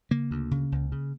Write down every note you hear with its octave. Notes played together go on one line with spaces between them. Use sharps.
C#3 A#3
D2
C#3
C#2
C#3